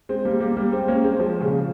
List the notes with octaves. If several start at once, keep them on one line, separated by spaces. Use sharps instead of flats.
G#3 C4
G3 A#3
G3 A#3
G3 A#3
G#3 C4
A#3 C#4
G#3 C4
F3 G#3
A#2 C#3